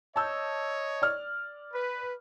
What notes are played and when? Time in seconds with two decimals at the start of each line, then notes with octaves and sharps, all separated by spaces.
0.16 C#5 D#5 A5 E6 G6
1.02 D5 F6
1.74 B4